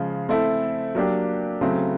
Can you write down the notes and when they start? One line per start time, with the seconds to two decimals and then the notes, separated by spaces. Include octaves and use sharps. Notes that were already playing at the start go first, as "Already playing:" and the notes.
Already playing: C#3 F3 G#3
0.29 A3 C4 E4 A4
0.95 F#3 A#3 D4 G4
1.61 C#3 F#3 A3 C4 E4